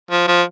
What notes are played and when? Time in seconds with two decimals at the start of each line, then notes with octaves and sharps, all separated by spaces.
0.11 F3
0.28 F3